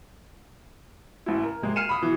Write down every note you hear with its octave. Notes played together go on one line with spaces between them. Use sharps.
A1 E4
A#4
C3 G#3 A#3
F6 C7 C#7 D#7 E7
B5 D#6
B2 E3